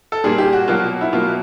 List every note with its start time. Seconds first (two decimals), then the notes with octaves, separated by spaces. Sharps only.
0.12 A4
0.24 A#2 G3 A#3 G#4
0.38 G4
0.53 F#4
0.68 B2 F#3 A#3 F4
1.01 E4
1.13 B2 F#3 A#3 F4